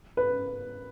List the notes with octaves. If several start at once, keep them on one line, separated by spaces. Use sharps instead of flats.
B4